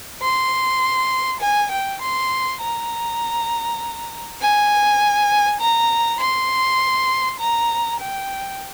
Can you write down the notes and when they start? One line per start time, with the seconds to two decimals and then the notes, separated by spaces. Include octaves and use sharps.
0.22 C6
1.41 G#5
1.71 G5
2.02 C6
2.61 A#5
4.41 G#5
5.61 A#5
6.21 C6
7.40 A#5
8.00 G5